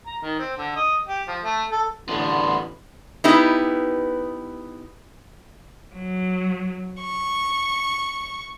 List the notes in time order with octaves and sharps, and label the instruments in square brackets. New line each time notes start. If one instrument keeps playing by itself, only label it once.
[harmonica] A#5
D#3
C4
D3
D#5
G4
F3
A3
A4
[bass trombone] A1 [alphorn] D3 [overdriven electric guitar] A3 B3 [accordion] C6
[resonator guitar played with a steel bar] B3 D#4 E4 G4 B4
[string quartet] F#3
C#6